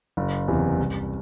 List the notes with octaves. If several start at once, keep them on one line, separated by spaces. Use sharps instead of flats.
F#1
E2 C3 E3
C2